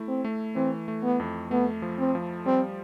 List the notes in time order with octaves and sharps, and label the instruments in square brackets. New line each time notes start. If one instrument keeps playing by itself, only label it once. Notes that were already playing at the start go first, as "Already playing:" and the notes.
Already playing: [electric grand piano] A3 E4
[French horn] C4
[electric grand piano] A3
[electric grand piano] E3 [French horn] C4
[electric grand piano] A3
[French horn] B3
[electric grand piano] F2
[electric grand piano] A3 [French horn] B3
[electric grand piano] F3
[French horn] C4
[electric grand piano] F3
[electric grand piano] G3 [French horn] C4